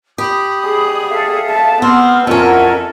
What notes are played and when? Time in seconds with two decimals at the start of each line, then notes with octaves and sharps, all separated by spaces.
0.18 G4 B5 D#6
0.67 G#4
1.10 A4 E5 F5
1.50 A5
1.82 B3 C4 C6 F6
2.27 F2 C#4 E4 A4 A#4 F#5